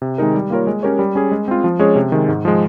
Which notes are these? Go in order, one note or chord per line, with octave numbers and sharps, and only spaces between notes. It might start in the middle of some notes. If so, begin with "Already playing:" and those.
C3
D#3 G#3 D#4 A#4
G3
A#3 F4 A#4 C#5
G#3
C#4 G4 A#4 C#5
G3
C#4 G#4
G#3
C4 F4
F3
G#3 C#4 G#4 C#5
C3
D#3 G#3
G#2
F3 G#3